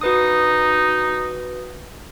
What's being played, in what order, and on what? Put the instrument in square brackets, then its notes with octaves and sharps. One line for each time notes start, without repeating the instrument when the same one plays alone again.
[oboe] D#4 [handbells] F#4 B4 D#6